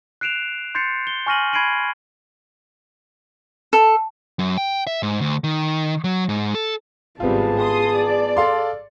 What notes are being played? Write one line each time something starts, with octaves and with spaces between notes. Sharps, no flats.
F#6 C7 D7 E7 F7
C6 G6 A6 C7 C#7
G7
G#5 C#6 F6 A#6 D#7 F#7
B5 G#6 C7 D7 D#7 F#7
A4
F#2
G5
E5
G#2
D2
D#3
F#3
G#2
A4
G#1 C3 G3 B3 F4 G#4 A5
C6 D#6
D5
A4 F5 C6